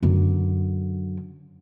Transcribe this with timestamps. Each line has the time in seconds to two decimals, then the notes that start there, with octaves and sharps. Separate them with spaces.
0.03 F#2 D3